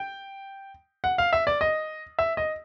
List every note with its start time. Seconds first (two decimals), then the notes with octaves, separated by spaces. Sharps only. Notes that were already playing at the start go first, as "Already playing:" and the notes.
Already playing: G5
1.04 F#5
1.18 F5
1.33 E5
1.47 D5
1.61 D#5
2.19 E5
2.37 D#5